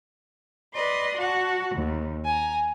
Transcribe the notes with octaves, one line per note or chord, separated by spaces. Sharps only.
B4 D5 D#5 C6
F#4 F#5 A5
D#2
G#5 A#5